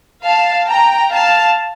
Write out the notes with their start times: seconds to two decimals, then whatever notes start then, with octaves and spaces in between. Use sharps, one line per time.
0.24 F5 A5
0.68 G5 A#5
1.11 F5 A5